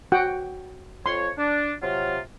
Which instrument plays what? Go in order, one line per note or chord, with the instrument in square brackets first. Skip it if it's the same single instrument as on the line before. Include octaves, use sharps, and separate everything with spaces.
[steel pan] F#4 F#5 G5
[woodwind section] F2 C#5 [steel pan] C6
[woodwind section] D4
C3 F#3 F4